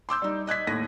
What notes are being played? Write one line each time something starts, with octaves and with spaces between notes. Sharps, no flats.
C6 D6 E6 G6
G3 D#4
D#5 F#6 G#6 B6
D#2 A2 A#6 D#7